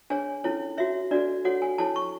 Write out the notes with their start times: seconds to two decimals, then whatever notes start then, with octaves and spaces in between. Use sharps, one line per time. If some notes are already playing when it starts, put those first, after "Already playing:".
0.10 D4 G#4 C#5 G#5
0.44 C#4 E4 A4 C#5
0.77 F#4 C#5 E5
1.11 D4 F#4 A4 D5
1.45 F#4 A4 C#5 F#5
1.62 G#5
1.78 E4 A4 C#5 A5
1.96 C#6